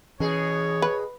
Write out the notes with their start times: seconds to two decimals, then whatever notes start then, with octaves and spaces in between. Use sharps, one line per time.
0.20 B2 E3 C#4 G#4 C#5
0.82 B4